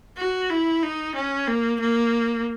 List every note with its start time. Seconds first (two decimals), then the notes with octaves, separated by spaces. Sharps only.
0.17 F#4
0.50 E4
0.83 D#4
1.15 C#4
1.47 A#3
1.80 A#3